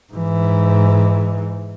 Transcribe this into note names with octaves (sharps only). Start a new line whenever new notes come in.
G#2 E3